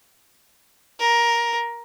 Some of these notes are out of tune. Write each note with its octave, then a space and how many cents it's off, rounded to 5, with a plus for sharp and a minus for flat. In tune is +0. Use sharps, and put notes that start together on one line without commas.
A#4 +15